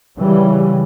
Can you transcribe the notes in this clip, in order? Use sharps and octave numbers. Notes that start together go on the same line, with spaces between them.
C#3 E3 G3